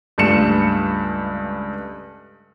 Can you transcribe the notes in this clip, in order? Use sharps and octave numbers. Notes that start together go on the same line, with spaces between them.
C#2 G2 A3 C#7 E7